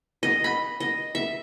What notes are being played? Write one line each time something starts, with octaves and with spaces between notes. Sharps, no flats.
D#5
B5
D#5
E5